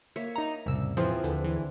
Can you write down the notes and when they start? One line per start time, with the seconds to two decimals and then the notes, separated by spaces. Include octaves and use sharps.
0.16 A#3 C#5 E5
0.36 D#4 A#5
0.66 C2 F2 A2 C#3 E6
0.97 E3 F3 C4 G#4
1.24 D#2 D3 G#4 B4
1.44 E3